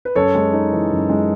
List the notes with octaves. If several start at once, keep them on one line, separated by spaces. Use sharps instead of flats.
B4
F#2 A4 C#5
G#3
D#4
E3
F#2
G#3